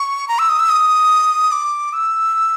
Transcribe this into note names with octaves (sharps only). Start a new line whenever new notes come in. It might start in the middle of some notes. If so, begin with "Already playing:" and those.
Already playing: C#6
A#5
E6
D#6
E6
D#6
D6
E6